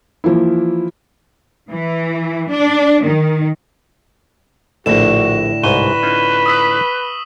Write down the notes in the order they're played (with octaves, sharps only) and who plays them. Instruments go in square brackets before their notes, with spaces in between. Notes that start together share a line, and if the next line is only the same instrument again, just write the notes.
[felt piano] E3 F3 A#3 E4
[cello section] E3
D4
D#3
[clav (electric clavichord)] A#1 A5 [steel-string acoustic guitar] A2 D3 [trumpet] F#4 [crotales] A#6 E7
[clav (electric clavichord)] C2 G#2 [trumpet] B4 [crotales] C#6 D#7 G7
[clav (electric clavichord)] C#4 D#4 F4
[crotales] D#6 E6 B6